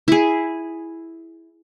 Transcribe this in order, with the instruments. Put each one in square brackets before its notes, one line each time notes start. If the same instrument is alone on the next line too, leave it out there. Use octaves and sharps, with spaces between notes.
[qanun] E4 G#4